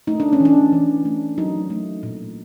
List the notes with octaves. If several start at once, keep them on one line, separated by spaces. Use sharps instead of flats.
A3 D#4
D4
C#4
E3
D4
E3
A3
F#3 D#4
A3
A#2